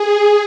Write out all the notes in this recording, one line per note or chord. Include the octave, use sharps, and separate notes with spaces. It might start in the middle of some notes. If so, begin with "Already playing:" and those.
Already playing: G#4